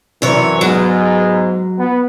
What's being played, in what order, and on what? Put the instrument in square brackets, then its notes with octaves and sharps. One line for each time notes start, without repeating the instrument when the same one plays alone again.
[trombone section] F#2 E3 [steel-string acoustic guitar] C3 C#5
[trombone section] G#2 B3 [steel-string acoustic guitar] F#3
[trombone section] B3